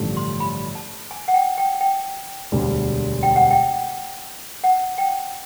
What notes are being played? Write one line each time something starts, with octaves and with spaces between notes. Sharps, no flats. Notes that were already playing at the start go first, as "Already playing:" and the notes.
Already playing: A1 G2 D3 F3 A3
C6
B5
A5
G#5
F#5
G5
G5
G5
E1 D2 D3 G3
G5
F#5
G5
F#5
G5